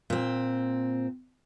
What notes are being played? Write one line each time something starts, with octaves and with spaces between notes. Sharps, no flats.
A#2 C4